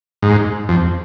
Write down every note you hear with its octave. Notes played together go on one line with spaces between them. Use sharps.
G#2
F2